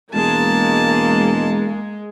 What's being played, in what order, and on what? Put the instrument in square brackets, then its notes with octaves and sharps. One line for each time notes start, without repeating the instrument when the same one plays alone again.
[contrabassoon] E1 [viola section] G#3 [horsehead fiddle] A#3 [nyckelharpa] A5